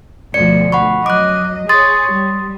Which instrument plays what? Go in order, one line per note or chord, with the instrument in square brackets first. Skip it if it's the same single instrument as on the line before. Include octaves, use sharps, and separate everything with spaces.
[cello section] D2 B2 F3 [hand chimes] D5 C#7
[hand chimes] F#5 B5 C#6
[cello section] F#2 F#3 D#5 [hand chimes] D6 F#6
[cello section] G#4 C#5 [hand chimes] C6 D#6 A6
[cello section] G3